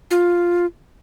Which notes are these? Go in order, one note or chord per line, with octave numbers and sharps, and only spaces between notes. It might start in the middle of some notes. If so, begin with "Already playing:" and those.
F4